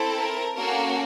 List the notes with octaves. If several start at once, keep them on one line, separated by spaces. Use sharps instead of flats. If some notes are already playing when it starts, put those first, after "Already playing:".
Already playing: C4 E4 A4
A#4
A#3 C#4 F#4 A4 A#4